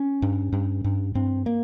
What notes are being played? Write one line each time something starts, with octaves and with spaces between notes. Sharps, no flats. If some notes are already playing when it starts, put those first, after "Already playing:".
Already playing: C#4
G2
G2
G2
G2 C4
A#3